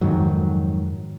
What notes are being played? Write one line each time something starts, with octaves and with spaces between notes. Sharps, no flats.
F2 G#2 D#3 F#3